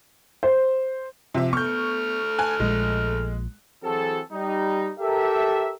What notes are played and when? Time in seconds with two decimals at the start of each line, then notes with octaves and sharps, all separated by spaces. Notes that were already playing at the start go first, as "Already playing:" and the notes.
0.43 C5
1.34 C3 F3 E5
1.53 A3 B3 C#6 F6 G6
2.38 G#5 A5 F#6
2.60 A#1 A#2 F3 G#3
3.84 E3 F#3 C4 F#4 G#4 A4
4.33 G3 D#4
4.99 G4 A4 A#4 E5